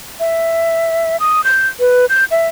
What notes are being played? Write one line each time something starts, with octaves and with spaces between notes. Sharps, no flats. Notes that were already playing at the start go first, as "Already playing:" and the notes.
E5
D#6
G6
B4
G6
E5